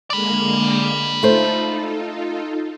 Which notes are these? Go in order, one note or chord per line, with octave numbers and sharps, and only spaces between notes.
D3 G#3 A#3 D5 B5
A3 D#4 F4 A4 C5